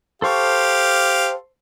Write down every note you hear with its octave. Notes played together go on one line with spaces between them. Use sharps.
G4 A4 C5 F5 C#6